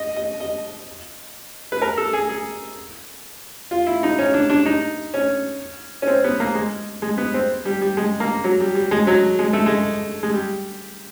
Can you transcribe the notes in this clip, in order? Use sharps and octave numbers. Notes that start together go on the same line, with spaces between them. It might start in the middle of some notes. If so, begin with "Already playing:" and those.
Already playing: D#5
D#5
D#5
B4
A#4
A4
G#4
G#4
F4
E4
D#4
C#4
D4
D4
D#4
C#4
C#4
C4
B3
A#3
G#3
G#3
B3
C4
G3
G3
G#3
A#3
F#3
G3
G3
G#3
F#3
G#3
A3
G#3
G#3
G3